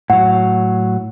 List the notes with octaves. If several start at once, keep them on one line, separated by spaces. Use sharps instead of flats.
A2 F#3 F#5